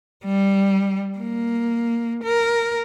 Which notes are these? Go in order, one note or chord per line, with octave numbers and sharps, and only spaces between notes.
G3
A#3
A#4